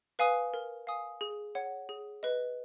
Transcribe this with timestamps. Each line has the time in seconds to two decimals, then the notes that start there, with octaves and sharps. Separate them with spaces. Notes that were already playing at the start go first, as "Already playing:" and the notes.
0.19 B4 F5 G#5 D#6
0.54 A#4
0.87 F5 G#5 D#6
1.21 G#4
1.55 C#5 F#5
1.89 G#4
2.23 B4 D#5